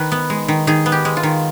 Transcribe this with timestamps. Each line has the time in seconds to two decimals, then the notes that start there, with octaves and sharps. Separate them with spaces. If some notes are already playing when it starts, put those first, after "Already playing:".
Already playing: D#3 B4
0.12 B3
0.30 G#3
0.48 D#3
0.67 D#3 G#4
0.86 B3
0.92 G4
1.05 G#3
1.17 F4
1.23 D#3